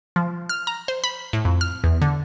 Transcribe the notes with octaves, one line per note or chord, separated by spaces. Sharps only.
F3
F6
A#5
C5
B5
A2
F2
F6
E2
D3